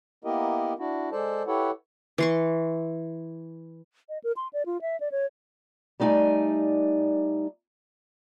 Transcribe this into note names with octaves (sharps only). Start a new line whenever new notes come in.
A#3 B3 E4 G4 A#4 D#5
D4 E4 F#4
G#3 A4 C5 D5 A5
E4 G4 A4 B4 C#5 F#5
E3 C6 C#6
D#5
A#4
C6
D5
F4
E5
D5
C#5
G3 A3 D#4 D5 G#5